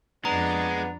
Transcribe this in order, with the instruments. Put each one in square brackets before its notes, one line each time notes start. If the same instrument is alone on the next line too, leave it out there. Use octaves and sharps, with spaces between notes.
[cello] F2 D4 [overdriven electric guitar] G#3 [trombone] B3 [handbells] A#5